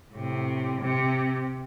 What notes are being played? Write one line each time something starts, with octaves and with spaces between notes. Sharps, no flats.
A2 C3
C3